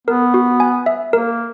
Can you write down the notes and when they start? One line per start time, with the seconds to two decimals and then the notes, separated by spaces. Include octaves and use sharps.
0.07 B3 A#4
0.34 F#4
0.60 G#5
0.86 E5
1.13 A#3 A#4